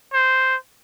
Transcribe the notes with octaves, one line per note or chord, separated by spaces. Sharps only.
C5